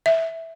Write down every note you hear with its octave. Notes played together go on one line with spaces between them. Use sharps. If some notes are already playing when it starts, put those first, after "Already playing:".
E5